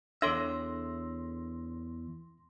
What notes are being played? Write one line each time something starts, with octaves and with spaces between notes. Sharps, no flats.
E2 D4 A4 C#5 E5 C6 A#6